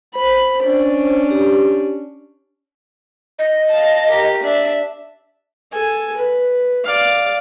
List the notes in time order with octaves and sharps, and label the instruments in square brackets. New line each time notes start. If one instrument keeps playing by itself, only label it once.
[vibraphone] C5 [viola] B5
[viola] C#4 D4
[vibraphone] G4
[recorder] D#5
[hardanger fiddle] F5 A5
G4 A#4
D4 E5
[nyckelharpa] A4 G#5
B4
D5 F5